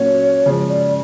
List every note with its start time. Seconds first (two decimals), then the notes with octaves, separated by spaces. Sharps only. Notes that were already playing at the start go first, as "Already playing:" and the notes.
Already playing: A#2 F#3 A#3 C#4 F#4 C#5
0.46 C#3 F3 G#3
0.69 D5